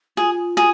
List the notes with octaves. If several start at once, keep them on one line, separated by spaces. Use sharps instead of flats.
F4 G#4
G#4